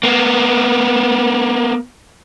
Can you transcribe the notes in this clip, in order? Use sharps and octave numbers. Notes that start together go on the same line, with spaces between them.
A#3 B3